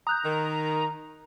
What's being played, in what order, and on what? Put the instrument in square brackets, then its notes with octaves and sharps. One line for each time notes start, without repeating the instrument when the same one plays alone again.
[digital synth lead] A#5 [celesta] D#6 F#6 G6
[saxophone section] D#3